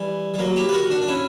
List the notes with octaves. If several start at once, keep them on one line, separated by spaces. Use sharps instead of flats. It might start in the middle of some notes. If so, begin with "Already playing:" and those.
Already playing: E3 G3
G3
F#3 A#3
E4 G4
B4
F#4 A#4
D4 F#4
D4
C#4 E4